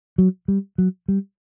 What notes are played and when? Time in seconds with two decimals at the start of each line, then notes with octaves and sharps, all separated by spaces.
0.18 F#3
0.48 G3
0.78 F#3
1.08 G3